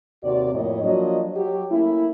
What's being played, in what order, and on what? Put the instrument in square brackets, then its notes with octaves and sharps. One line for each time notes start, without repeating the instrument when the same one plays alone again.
[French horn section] D#2 C3 F#4 D5
F2 A2 A#3 E4 C#5 D#5
F3 F#3 A#3 D4 D#5
F#3 G4
A3 A#3 C#4 E4